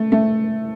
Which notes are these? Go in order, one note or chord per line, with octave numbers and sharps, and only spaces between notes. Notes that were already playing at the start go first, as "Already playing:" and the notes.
Already playing: A3
A3